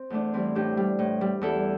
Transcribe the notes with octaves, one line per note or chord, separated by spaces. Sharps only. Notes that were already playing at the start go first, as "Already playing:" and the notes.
Already playing: C4
E2 A3 D4
E3 G3 C4 E4
A2 D4 G4
G3
A2
G3
E2 E4 A4